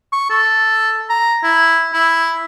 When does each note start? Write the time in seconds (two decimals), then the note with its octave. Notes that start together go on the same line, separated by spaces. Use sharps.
0.13 C#6
0.30 A4
1.09 A#5
1.43 E4
1.93 E4